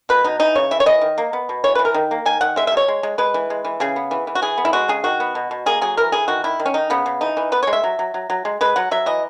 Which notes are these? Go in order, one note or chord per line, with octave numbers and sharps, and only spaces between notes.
B2 B4
B2 D#4
E3 D#4
C#3 C#5
E3 E5
C#5
E3 D#5
D#3
A#3
B3
B2
E3 C#5
E3 B4
A#4
D#3
A#3
D#3 G#5
D#3 F#5
G#3 E5
E5
B2 C#5
G#3
G#3
G#3 B4
E3
G#3
E3
C#3 G#4
B3
E3
E3
F#4
E3 G#4
B3
E4
G#3 F#4
C#3 G#4
D#3 F#4
B3
B2
B2
A#3 G#4
F#3 G#4
E3 A#4
E3 G#4
D#3 F#4
D#3 E4
D#3
C#4
D#3 D#4
C#3 B3
C#3
E3 D#4
E3
B3 B4
G#3 C#5
E5
F#3
F#3
F#3
F#3
G#3
G#3 B4
F#3 F#5
F#3 E5
E3 D#5